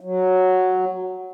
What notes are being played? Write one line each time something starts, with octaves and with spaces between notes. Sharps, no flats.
F#3